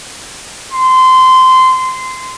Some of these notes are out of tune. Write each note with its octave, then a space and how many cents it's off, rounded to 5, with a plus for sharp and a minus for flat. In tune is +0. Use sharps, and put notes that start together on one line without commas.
C6 -20